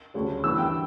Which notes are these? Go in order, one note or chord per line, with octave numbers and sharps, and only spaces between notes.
D2 C#3 G3 C#4
G2 E3 B3 D4 E6
G5